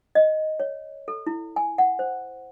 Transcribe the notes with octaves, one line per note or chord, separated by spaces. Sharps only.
D#5
C#5
A4
E4
G#5
F#5
C5